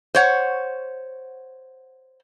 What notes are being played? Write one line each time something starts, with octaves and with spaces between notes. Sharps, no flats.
C5 C#5 F#5